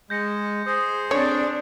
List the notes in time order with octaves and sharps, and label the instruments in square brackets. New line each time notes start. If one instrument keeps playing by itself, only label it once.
[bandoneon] G#3 [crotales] G6 A#6 C#7
[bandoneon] G#4 C5 [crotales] D#6 A#6
[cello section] C4 D4 [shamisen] C#5